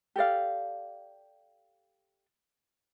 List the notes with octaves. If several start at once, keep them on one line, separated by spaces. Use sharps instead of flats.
G4 A4 D5 F5